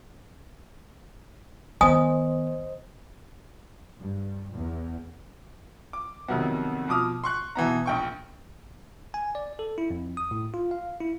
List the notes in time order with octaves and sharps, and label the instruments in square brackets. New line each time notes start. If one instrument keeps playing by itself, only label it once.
[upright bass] D#3 B3 [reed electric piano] C5 D#5 [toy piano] G#5 D#6
[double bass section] G2
E2
[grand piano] D6
F2 C3 D#3 F#3 B3
B2 F3 D6 D#6 F6
C6 C#6 F#6
B2 E3 B3 A#5
A#1 G5 C#6
[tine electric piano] G#5
D5
A4
E4
F2
D#6
A2
F4
F5
E4